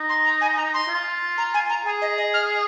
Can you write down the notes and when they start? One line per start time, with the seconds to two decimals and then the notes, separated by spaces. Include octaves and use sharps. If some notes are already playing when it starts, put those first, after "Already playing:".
Already playing: D#4
0.09 C6
0.25 A#5
0.41 G#5
0.57 A#5
0.74 C6
0.89 F4
1.38 A#5
1.54 G#5
1.70 A#5
1.85 G#4 G#5
2.02 D#5
2.18 D#5
2.34 F6